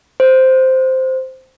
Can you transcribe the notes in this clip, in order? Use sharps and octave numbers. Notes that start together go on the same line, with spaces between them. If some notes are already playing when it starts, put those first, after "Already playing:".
C5